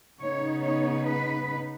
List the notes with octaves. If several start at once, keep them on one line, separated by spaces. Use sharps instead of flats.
C#3 B3 D#4 C#5
C#5
B4